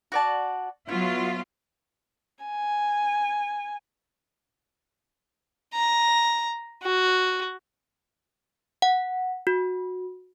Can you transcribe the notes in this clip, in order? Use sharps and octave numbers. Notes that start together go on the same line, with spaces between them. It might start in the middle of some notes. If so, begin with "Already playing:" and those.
F#4 D5 A5
F#3 B3 E4 F4
G#5
A#5
F#4
F#5
F#4